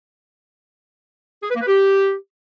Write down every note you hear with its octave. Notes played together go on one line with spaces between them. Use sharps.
G#4
B4
A#3
B4
G4